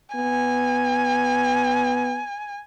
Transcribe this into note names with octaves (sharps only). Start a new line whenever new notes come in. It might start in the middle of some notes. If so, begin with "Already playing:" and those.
B3 G#5